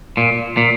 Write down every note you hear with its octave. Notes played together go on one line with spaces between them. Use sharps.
A#2
A#2